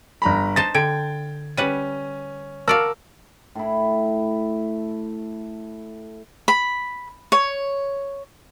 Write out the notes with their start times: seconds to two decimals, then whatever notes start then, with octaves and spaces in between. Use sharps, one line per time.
0.22 G1 A#5 B5
0.56 D#4 C5 A5 A6
0.74 D3 G5 G#6 D7
1.57 G3 C#4 B4 F#5 D#7
2.68 F#4 A#4 D5 F5 A5 E6
3.55 A2 E4
6.48 B5
7.32 C#5